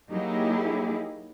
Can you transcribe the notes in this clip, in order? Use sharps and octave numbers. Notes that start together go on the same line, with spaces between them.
F#3 A#3 D#4 E4 G4 G#4